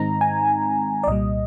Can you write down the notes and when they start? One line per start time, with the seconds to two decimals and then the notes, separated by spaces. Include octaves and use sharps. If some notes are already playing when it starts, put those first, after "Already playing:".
Already playing: G#2 D#3 G#3 C4 D#4 A#5
0.21 G#5
1.04 D5
1.07 C2 A#2 G3 D#5